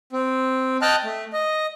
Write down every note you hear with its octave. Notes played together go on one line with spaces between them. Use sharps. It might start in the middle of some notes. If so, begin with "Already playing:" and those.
C4
D#5 G5 A5 F6 F#6
A3
D#5